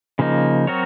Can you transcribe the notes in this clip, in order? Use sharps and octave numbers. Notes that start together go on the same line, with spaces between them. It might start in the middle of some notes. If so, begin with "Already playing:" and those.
C#3 F3 A#3 D#4
F#3 C4 F#4 A#4 C#5